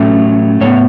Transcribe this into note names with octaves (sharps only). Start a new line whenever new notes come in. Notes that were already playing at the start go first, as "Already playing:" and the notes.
Already playing: A2 F#3 A3 C#4 B4
A2 G#3 B3 C#5